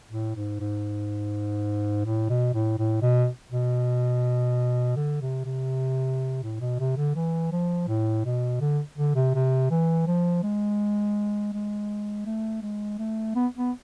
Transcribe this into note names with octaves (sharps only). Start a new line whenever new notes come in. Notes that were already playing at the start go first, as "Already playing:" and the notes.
A2
G#2
G#2
A2
B2
A2
A2
B2
B2
D3
C3
C3
A2
B2
C3
D3
E3
F3
A2
B2
D3
D3
C3
C3
E3
F3
G#3
G#3
A3
G#3
A3
B3
B3